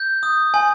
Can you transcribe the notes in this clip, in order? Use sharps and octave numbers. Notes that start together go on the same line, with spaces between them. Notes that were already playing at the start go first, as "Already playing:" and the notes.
Already playing: G6
D#6
G#5